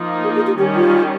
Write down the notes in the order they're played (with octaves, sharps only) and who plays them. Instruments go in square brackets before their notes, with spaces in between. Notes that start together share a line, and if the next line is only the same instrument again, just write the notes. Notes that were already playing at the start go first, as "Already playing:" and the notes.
Already playing: [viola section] F3 A#3 D#4
[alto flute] G#4
G#4
G4
[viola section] D#3 G3 C#4 [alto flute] G4
[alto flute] F4